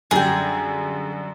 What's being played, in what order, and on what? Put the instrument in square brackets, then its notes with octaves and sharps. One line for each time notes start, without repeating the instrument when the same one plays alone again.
[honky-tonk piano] F#2 D3 G3 [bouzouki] G#4 G5